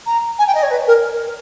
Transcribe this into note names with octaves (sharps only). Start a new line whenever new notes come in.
A#5
G#5
G5
D#5
C#5
B4
A#4